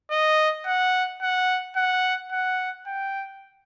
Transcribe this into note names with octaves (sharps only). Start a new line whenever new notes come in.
D#5
F#5
F#5
F#5
F#5
G5